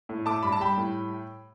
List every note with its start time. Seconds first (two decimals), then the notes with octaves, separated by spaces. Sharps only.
0.09 A2
0.25 A3 A5 D6
0.43 G2 B5
0.52 A5
0.60 G3 G5 B5
0.77 A2